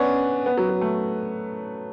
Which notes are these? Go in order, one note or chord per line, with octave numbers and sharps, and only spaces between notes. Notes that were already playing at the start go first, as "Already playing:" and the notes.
Already playing: B3 C#4 D4
B3
F#3
F#3
A3